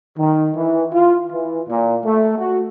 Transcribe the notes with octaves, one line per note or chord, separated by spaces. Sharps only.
D#3
E3
F4
E3
A#2
A3
F#4